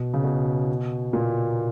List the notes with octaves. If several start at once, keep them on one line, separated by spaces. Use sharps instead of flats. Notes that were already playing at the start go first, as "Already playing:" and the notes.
Already playing: B2
C#3
B2
A#2